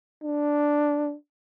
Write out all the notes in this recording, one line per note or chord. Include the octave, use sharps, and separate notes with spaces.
D4